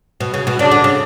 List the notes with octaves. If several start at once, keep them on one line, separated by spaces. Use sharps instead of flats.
B2
C#3
B2
C#3 D4
D3
C#3